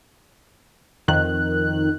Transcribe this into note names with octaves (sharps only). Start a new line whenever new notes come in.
F2 D#3 F#6